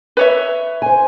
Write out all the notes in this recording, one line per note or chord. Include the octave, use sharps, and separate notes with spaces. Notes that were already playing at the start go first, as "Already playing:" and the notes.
B4 C#5 E5
C5 G#5